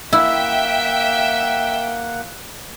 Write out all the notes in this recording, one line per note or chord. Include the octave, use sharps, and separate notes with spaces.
A#3 E4 E5 F#5 G5